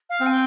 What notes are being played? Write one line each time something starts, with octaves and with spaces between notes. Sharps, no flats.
F5
C4
G#5
G5